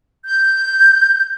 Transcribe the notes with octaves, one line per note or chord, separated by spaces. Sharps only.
G6